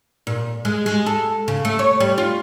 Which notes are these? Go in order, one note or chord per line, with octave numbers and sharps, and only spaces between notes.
A#2
G#3
G#3
A4
C#3
A3
C#5
G3
F4